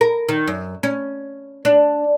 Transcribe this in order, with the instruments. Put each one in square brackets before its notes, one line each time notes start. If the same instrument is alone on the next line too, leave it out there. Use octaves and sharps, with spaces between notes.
[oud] A#4
D#3
F#2
C#4
D4